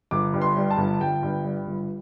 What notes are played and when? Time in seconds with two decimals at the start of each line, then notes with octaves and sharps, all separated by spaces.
0.11 G1 D6
0.33 G2
0.42 C6
0.56 G3
0.70 A5
0.78 G1
1.01 G1 G5
1.23 G2
1.44 G3
1.67 G1